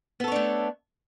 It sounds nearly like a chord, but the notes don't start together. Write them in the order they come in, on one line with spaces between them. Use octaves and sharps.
B3 A4 C#5 D4 A3